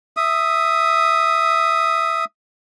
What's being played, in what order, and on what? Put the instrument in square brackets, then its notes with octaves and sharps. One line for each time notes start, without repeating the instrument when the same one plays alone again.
[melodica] E5 D#6